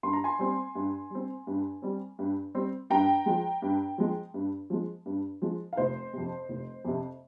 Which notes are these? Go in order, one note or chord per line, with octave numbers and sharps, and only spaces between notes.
G2 C6
A#5
G#5 C6
G3 C4
G2
G3 C4
G2
G3 C4
G2
G3 C4
G2 G5 A#5
F3 G#3
G2
F3 G#3
G2
F3 G#3
G2
F3 G#3
F5
F1 C5 D#5
F2 C3
F1
F2 C3